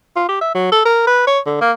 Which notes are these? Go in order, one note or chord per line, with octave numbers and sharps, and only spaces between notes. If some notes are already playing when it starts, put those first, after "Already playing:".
F4
G4
E5
F#3
A4
A#4
B4
C#5
D3
A#3